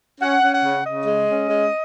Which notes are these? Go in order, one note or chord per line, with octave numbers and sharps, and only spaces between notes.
C#4 F#5
C#4
F#5
C#3
C#3 D#5
G#3
C#4
G#3